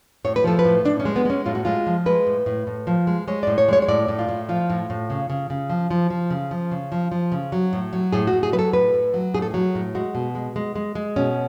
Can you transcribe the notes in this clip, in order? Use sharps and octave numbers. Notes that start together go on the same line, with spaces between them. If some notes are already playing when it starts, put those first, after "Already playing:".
A2 C#5
B4
F3 A4
B4
A2
A2 D4
C#4
G#3
B3
G#3 C#4
A2 F4
F#4
G#3 F4
F3
G#3 B4
A2
A2
A2
F3
G#3
G#3 C#5
A2 D5
C#5
G#3 C#5
C#5
A2 D5
A2
F4
A2
F3 F4
A2
A2
C#3
C#3
C#3
F3
F3
F3
C#3
F3
C#3
F3
F3
C#3
F#3
A2
F#3
A2 G#4
F#4
A2
G#4
F#3 B4
A4
A2 B4
A2
F#3
A2 G#4
A4
F#3 G#4
A2
G#3 F#4
B2
G#3
G#3
G#3
G#3
B2 C#4